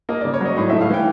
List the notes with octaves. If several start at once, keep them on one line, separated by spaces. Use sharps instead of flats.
A#3 D#5
C#3 D5
C#5
F#3 D#5
A2 D#5
A3 E5
F5
E3 G5